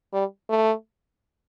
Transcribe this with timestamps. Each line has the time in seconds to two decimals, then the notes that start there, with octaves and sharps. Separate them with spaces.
0.13 G3
0.49 A3